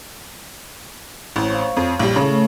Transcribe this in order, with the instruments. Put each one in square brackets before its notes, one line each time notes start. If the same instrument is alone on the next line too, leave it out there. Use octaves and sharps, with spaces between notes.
[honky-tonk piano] A1 [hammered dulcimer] C4 C#5 A#5
[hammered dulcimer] C#5 F5
[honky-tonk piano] F2
A#1 G3
[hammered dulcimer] A2 A3 C#5 [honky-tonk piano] C#3